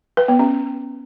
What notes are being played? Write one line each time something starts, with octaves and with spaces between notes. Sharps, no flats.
B4
B3
C#4